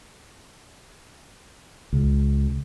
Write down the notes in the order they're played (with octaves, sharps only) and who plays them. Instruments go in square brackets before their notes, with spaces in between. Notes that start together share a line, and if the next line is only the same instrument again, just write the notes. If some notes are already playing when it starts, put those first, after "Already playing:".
[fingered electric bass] C#2